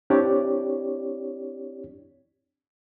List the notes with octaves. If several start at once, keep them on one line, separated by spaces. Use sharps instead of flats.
C4 D4 E4 G4 C#5 D5